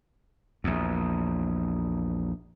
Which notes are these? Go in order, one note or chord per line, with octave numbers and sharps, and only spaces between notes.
A#1 E2